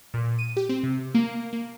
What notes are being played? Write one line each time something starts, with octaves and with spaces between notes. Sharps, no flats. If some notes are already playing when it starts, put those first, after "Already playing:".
A#2
D#7
G4
C4
C3
A#3
A#3